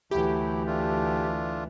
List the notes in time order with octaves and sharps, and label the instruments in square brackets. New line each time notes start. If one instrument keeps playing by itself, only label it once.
[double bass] D2 E3 [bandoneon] F#3 A3 E4 [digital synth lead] G4
[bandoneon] A3 D4 F4